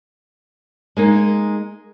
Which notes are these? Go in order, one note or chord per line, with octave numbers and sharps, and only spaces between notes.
G#3 A#3 D#4